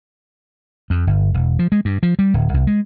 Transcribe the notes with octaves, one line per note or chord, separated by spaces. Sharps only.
F2
G1
E1
F3
G#3
G2
F3
G3
D1
C2
G#3